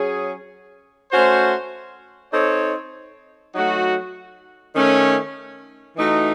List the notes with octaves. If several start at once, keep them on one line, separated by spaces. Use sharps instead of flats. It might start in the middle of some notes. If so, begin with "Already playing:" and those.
Already playing: F#3 C#4 G#4
A3 C#4 F#4 C5
C4 D#4 A4 C#5
F#3 A3 D#4 F#4
D#3 A3 C#4
E3 A3 D#4 F#4